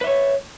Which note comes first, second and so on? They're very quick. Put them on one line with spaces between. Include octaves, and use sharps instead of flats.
B4 E5 C#5